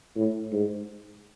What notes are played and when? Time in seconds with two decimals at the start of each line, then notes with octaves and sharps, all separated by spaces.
0.16 A2
0.52 G#2